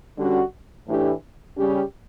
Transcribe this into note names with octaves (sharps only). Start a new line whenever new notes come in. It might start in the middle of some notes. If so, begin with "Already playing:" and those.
D3 G3 C#4 F#4
A2 E3 A3 D4 G4
C#3 G3 C#4 G4